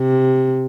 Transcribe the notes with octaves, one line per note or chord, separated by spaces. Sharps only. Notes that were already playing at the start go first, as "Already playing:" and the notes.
Already playing: C3